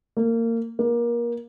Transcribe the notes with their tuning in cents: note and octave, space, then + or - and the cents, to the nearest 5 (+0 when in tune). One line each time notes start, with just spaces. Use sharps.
A#3 -25
A#3 +25